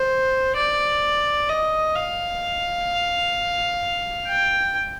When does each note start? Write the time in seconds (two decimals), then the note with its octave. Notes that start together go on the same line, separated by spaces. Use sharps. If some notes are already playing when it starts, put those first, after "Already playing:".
Already playing: C5
0.55 D5
1.48 D#5
1.95 F5
4.28 G5